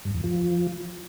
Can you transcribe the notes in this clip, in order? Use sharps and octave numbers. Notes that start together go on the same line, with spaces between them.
G2
E2
F3